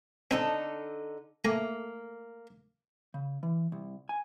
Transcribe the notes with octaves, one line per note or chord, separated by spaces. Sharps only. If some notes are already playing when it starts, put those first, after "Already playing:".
D3 C4 D#4 A4 G#5
A3 A#3 G#5 A#5
C#3
E3
C2
G#5